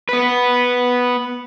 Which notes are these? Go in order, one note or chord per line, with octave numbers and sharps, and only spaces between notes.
B3 B4